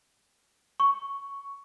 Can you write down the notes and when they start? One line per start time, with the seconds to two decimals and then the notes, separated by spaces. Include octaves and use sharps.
0.80 C#6